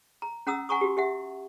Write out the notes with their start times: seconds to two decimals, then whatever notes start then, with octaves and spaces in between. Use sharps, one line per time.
0.22 A#5
0.47 C#4 F#5 A#5 D#6 E6
0.69 F#5 G#5 A#5 C#6 D#6
0.81 F#4 G4
0.97 G4 E5 F#5